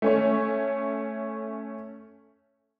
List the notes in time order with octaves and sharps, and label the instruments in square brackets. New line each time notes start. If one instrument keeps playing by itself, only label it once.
[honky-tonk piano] A3 C#4 C#5